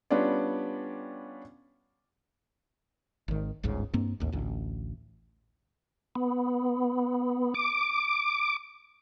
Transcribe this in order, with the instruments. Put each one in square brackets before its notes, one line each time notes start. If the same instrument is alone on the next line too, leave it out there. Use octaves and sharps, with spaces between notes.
[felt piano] G3 B3 C#4 D4 F4 D5
[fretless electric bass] G#1 D#3
G1 C#2 G#2 C#3
G2 A#3 C4
A1 D#2
A1 D2
[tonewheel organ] B3
D6